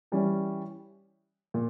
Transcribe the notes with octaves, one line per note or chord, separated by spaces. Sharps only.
E3 G3 C#4
A#2